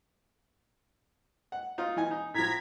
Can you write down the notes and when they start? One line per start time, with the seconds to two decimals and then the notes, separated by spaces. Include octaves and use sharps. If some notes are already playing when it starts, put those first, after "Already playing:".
1.52 F#5
1.78 D#4 F4
1.96 E3 D#5 G#5
2.11 D#4
2.34 A2 F3 A#5 G#6 B6